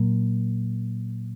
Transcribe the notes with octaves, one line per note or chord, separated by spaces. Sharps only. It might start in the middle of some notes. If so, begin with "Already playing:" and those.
Already playing: A#2 F#3 A#3